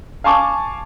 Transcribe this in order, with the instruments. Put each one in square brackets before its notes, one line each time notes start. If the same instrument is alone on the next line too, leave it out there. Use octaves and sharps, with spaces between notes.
[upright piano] F5 G#5 A5 C#6 D6